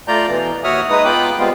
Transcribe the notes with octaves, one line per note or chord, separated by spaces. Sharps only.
A3 F4 D5 A#5 G6
B2 E3
D#2 F#4 C#5 E5 D#6 F6
G#3 D#4 B4 D#6
B3 F4 G5 B5 D6 F#6
G3 G#3 B3 C4 F4